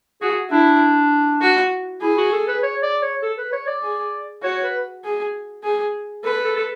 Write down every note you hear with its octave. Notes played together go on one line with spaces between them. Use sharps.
F#4 G#4
D4 E4
F#4
E4 G#4
F#4
A4
B4
C#5
D5
C#5
A4
B4
C#5
D5
G#4
F#4 C#5
B4
G#4
G#4
A4 B4
A4
A4